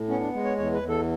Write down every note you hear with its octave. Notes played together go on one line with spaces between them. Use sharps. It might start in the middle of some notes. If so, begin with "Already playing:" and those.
Already playing: A2
B3 C#4
D4
G#3
C#5
E2 C#5
B4
E2
A4